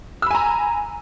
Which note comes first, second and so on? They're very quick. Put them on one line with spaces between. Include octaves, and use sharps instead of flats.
E6 B5 G#5 A#5